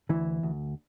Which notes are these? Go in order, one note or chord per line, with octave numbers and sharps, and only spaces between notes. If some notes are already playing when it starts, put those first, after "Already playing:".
D2 E3 E4
D2